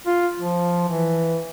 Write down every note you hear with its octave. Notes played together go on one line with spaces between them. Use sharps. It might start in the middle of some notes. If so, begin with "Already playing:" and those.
F4
F3
E3